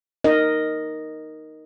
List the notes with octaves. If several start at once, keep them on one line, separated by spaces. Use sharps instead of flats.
D#4 A#4 D#5